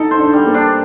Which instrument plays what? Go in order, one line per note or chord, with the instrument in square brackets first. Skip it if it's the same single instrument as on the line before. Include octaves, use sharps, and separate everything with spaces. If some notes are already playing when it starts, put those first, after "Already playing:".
Already playing: [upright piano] D#4 [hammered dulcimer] A4
[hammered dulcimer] C5
[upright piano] D4
[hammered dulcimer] G3
[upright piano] A#3
[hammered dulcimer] D4